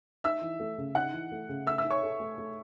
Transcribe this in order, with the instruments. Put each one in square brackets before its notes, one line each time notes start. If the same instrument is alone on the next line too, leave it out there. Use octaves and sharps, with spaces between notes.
[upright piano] D#4 [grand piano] E5 E6
[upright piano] E3
A3
C#3
[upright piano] D#4 [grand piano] F#5 F#6
[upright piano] E3
A3
C#3
[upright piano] A3 [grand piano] E5 E6
[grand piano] E5 E6
[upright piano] D#4
[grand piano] C#5 C#6
[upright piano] A4
A3
A3